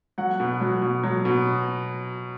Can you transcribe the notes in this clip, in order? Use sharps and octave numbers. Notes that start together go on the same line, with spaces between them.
F#3 F#5
B2
F#3
B2
F#3
B2